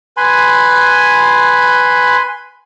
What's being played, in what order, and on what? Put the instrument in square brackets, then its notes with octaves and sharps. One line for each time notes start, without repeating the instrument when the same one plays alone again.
[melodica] B4 G#5 B5 C6